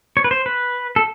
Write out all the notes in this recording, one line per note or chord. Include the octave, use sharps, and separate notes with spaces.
C#5
B4
C5
B4
A4